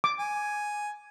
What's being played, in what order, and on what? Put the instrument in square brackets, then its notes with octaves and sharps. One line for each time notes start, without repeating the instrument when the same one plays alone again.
[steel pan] D6
[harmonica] G#5